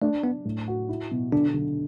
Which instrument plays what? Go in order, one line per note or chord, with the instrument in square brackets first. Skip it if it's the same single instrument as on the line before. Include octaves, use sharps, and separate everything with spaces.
[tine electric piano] A3 [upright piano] D4
[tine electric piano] B3 [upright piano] D4
[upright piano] A2
F#4
E4
B2
[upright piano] D3 [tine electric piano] D4
[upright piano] D3